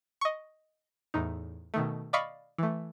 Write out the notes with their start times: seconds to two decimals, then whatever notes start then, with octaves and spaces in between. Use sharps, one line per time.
0.21 D#5 C#6
1.14 E2 A2 D#4
1.74 B2 D#3 A3
2.13 D5 D#5 F5 B5 C#6
2.58 E3 A3